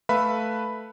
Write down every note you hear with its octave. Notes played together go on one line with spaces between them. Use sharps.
A3 B4 E5 F5 B5